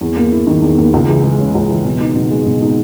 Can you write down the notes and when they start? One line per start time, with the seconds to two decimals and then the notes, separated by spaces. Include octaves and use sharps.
0.01 E2
0.17 A#3
0.32 E4
0.47 D#3
0.62 E2
0.78 A#3
0.93 C#2
1.08 E3
1.24 G#3
1.40 C#3
1.55 C#2
1.70 E3
1.85 B2
2.01 D#4
2.16 B2
2.31 G#3
2.46 B2
2.62 D#4